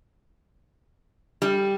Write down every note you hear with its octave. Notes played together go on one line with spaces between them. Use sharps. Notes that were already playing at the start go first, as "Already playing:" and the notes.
G3